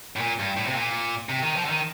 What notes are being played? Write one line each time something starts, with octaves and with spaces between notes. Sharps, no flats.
A2
A#2
G2
A2
C3
A#2
C3
D#3
F3
D3
D#3